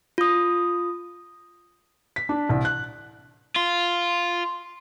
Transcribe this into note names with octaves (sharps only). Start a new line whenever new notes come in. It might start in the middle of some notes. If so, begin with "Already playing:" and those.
F4 D#6
B6
D4
C2
F#6
F4